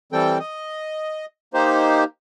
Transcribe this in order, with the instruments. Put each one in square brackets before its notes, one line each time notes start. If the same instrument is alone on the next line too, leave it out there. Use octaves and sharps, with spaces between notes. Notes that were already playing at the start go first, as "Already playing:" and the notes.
[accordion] E3 G3 C4 A4 G5
D#5
A#3 D#4 G4 C5